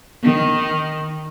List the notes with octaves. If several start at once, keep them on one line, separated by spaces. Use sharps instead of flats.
D#3